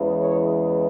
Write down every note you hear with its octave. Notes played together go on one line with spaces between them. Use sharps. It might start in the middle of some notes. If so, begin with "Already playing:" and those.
Already playing: E2 C#3 E3 G#3
C#5